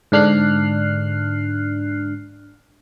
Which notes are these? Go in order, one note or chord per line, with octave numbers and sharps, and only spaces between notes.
G#2 D3 D4 F6 F#6 C7